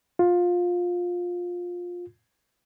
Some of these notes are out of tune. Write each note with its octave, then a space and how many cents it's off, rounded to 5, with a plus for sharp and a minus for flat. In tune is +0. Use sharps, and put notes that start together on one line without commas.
F4 +15